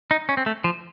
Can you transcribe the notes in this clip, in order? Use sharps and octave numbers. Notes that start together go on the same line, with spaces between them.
D#4
C#4
C4
A3
F3